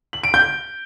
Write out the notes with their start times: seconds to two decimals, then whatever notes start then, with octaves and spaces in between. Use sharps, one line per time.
0.13 F#7
0.23 D7
0.34 G6